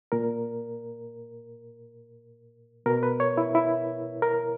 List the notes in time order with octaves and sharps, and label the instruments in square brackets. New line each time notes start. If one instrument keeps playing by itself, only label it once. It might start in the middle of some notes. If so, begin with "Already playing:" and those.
[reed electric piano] A#2 A#4
B2 A#4
B4
C#5
E4
E4
A#4